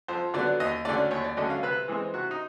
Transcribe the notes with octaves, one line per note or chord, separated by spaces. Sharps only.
F2 C5
D3 F#3 B3 D5
D#2 D#5
D3 F#3 A3 C#4 D5
D#2 C#5
D5
D3 F#3 A3 C#4 D#5
F5
C3 B4
E3 G#3 C4
C3 F#4
D#4